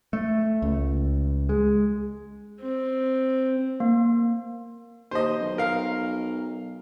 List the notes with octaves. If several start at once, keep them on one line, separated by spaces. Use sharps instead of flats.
A3
C#2
G#3
C4
A#3
D#2 C5 D#5
B1
A#4 F5